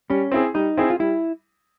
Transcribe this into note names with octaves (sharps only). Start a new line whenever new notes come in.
G3 C#4
C4 E4 G#4
G3 D#4
C4 E4 G#4
F4
G3 E4